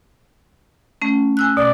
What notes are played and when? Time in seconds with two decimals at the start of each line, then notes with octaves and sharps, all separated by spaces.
1.02 A3 C#4
1.37 G#5 E6 F#6
1.57 B2 D5